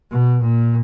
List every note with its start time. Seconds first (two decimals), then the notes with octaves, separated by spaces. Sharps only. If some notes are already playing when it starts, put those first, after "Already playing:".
0.11 B2
0.42 A#2